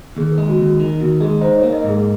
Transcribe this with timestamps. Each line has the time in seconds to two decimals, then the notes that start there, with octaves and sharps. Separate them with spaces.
0.17 D#2 G#4
0.32 A#4
0.38 G#3
0.48 F#4
0.58 D#2
0.64 F#4
0.80 D#3
1.00 D#2 F#4
1.20 G#3 G#4
1.41 D#4 C5
1.57 C#5
1.63 A#3
1.73 D#5
1.84 G#2
1.89 G#4